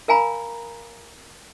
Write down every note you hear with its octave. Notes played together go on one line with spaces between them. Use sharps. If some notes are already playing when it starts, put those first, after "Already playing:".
A#4 F5 G#5 A#5 B5